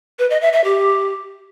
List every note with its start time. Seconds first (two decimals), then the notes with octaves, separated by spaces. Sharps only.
0.19 B4
0.30 D#5
0.42 E5
0.53 E5
0.64 G4